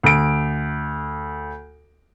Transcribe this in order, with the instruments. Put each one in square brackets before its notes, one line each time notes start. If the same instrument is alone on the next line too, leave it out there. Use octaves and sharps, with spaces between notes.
[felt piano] D2 D7